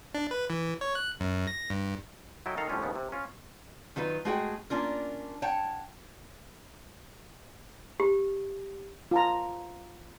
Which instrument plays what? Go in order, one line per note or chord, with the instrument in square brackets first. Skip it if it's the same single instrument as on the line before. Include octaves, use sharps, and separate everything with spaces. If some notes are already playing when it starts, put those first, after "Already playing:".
[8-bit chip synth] D4
B4
E3
C#5
F#6
F#2
A#6
G2
[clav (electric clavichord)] F#3 E4 A4 D#5 G5
D#3 A4 F5 A#5
A2 D3 F3 G3 C#4 F4
D#2 C#3 F3 B3
C3
C#4 F4
[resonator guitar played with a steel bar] D#3 F#3 F4 B4
G#3 A3 F#4 G#4 E5 G5
A#3 C#4 D4 F4 A#4
C#5 F#5 G5 A5
[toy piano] G4
[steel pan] F4 A5 A#5